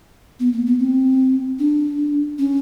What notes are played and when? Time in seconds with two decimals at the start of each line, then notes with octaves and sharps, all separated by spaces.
0.40 B3
0.53 A#3
0.66 B3
0.79 C4
1.59 D4
2.39 C#4